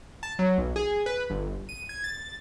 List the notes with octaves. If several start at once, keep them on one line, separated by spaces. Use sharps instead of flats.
A5
F#3
B1
G#4
B4
G1
D#7
G#6
A6